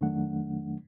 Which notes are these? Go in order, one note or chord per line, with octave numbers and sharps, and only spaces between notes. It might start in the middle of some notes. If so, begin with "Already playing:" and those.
F2 D#3 F#3 A3 D4 F#5